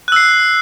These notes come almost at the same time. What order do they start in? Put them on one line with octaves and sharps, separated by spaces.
F#6 E6 C7